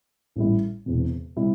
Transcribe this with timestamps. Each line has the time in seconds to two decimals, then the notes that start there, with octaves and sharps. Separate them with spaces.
0.36 A1 A2 G3 E4
0.86 E1 E2 C3
1.36 C3 G3 E4